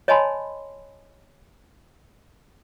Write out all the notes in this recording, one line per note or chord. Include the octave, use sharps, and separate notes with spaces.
C#5 D#5 G#5 A5 B5 C6